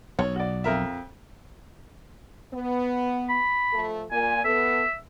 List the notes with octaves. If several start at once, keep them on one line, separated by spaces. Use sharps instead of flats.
B1 C#5
F#4 D5
F2 A#4 E5
B3
B5
F3 A3 A4
A#2 G#5
B3 A4 E5